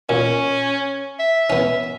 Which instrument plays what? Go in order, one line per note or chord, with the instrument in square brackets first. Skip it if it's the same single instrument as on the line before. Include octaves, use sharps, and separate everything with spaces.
[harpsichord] A#2 [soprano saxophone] C#4
[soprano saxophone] E5
[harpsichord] B3 C#4